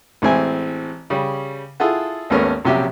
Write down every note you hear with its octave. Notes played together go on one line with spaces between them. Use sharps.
A1 E3 G#3 C4 E4 G#5
C#3 G3
E4 F4 G#4 A4 F#5
G#1 D#2 A3 B3 C#4 A#4
A#1 C3 F#3 C#4 G4 E5